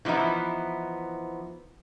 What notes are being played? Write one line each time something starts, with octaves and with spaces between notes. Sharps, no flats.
E3 F3 B3 D#4 E4